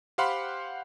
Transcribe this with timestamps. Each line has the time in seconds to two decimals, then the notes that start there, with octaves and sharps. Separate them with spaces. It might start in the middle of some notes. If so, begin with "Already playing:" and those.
0.18 G4 C5 F5 F#5 B5 C6